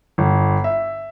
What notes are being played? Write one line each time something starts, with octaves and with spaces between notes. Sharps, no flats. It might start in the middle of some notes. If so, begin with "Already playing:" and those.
G1
E5